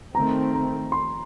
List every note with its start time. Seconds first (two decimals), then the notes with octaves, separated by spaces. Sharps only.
0.14 D#3 A3 C4 A#5
0.54 A#5
0.92 C6